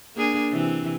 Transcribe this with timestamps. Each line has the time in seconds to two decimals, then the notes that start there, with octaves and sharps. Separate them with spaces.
0.16 A#3 D4 G#4
0.52 C3 E3 C4